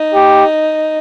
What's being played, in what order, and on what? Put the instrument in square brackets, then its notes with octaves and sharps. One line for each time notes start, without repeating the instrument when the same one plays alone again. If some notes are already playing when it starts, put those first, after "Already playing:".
Already playing: [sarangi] D#4
[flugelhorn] G4